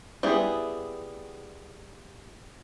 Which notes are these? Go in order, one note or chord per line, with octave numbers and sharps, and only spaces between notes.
G3 B3 E4 G#4